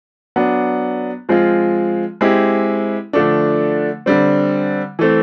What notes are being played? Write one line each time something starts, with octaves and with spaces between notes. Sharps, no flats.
F#3 B3 D4
F3 G#3 C4 F4
G#3 C4 E4 G4
D3 F3 A3 D4
D3 G3 C4
E3 A3 C4